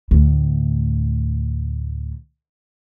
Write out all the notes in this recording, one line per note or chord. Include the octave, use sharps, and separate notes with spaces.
D2 A2